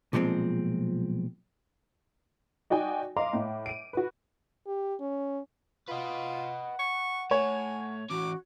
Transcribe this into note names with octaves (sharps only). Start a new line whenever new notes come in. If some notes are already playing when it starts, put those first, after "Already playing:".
B1 A#2 F3 G#3 C4
D#4 F#4 D5 G5 G#5
D#5 F5 A#5 C6 D6
A2
D7 D#7
F#4 B4
G4
C#4
F4 B4 D#5 F#5
C#6
A2 C#5 G#5
E3 C#4 F#4 D6